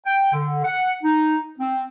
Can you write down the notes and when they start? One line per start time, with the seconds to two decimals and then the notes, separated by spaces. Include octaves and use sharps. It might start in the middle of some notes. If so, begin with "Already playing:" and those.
0.05 G5
0.33 D3
0.64 F#5
1.03 D#4
1.59 C4